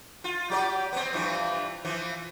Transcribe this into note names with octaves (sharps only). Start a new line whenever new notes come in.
F4
F#3 G4 D5
B3 C4
G2 E3 F3
E3 F3